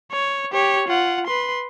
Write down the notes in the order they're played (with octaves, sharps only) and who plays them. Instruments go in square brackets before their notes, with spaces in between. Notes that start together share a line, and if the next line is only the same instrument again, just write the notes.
[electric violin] C#5
G4 C#5
F4 F#5
B4 C6